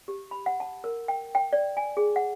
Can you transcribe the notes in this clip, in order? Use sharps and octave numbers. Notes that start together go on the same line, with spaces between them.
G4
B5
F#5
A5
A#4
G5
G5
D5
G#5
G#4
F#5